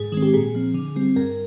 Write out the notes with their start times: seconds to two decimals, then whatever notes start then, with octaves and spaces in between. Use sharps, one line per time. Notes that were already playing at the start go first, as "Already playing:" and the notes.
Already playing: G#2 G#4
0.12 D#3 G#3 C4
0.22 G4
0.34 A#2 G#4
0.55 F3 C4
0.74 D3
0.96 G3 C4
1.16 G2 A#4